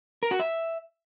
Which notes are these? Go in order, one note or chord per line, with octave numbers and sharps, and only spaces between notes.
A#4
F#4
E5